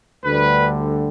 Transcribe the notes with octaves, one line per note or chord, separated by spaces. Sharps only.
D2 D3 G3 B4